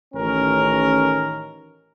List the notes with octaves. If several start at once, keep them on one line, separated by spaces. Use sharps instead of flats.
A1 D#3 C#4 A#4